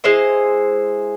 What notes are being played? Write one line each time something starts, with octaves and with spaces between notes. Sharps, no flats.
G#3 E4 C5 D#5